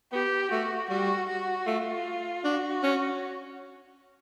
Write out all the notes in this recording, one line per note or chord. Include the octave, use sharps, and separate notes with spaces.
B3 G4
A3 F#4
G3 F#4
F#4
A3 F4
D4 F#4
C#4